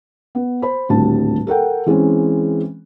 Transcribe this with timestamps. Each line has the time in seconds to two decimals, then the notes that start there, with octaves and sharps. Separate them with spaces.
0.35 B3
0.62 C5 B5
0.89 D#1 D2 A2 G3 C4 A5
1.47 A4 A#4 F#5 G5
1.86 E3 G#3 C4 C#4